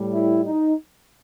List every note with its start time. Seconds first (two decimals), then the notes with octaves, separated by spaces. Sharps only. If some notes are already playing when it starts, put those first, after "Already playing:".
Already playing: A2 G3
0.13 E4
0.44 D#4